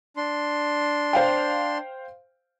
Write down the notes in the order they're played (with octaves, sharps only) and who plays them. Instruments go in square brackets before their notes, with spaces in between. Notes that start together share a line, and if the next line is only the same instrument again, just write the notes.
[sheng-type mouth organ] D4 C6
[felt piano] C5 F5 G5